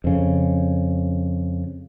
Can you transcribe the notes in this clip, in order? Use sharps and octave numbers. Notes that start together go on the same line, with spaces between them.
F2 C#3